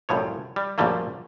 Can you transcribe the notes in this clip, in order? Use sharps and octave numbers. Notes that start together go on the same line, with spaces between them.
C2 F#2 A2 F3 C#5
G3
A#1 F#2 F3 G3 A3 A#3